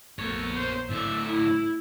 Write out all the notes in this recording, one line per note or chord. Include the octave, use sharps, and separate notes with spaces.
A#1 A3 B3 A#4 C#5
C5
A2 D3 A3 D5 E5
E4